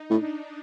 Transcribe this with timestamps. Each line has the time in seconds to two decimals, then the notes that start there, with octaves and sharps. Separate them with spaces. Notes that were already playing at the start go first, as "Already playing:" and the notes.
Already playing: D#4
0.10 A2 D4